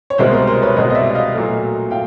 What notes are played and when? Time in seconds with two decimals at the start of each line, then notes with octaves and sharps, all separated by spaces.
0.10 C#5
0.18 C2 B2 G#3 A#4 C5
0.33 A#4 C5
0.47 A#4 C5
0.63 B4 C#5
0.76 C2 B2 G#3 C#5 D#5
0.90 D#5
0.95 D5 E5
1.15 D#5 F5
1.34 A#2 F#3 A3
1.91 A#2 F5 G5